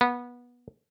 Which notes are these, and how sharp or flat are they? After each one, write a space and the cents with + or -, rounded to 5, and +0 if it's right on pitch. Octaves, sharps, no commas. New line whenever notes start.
B3 -20